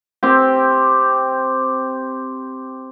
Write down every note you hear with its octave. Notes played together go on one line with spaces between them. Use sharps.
C4 G4